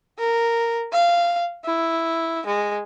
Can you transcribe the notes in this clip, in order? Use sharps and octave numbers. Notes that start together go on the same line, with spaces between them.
A#4
F5
E4
G#3